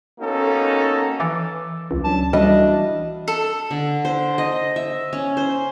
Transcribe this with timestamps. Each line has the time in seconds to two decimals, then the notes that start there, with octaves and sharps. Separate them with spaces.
0.18 A#3 B3 C#4 D#4 F#4 A4
1.20 E3 D6 E6 A6
1.91 C#2
2.04 F#3 C#4 D4 A5
2.33 E3 G3 D4 F#4 D#5 E5
3.28 A4
3.71 D3
4.05 C5
4.38 D#5
4.76 E5
5.13 C#4
5.37 C5